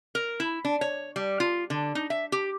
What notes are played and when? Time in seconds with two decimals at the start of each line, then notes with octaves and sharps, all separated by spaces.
0.15 A#4
0.40 E4
0.65 D4
0.81 C#5
1.16 G3
1.40 F4
1.70 D3
1.95 D#4
2.10 E5
2.32 G4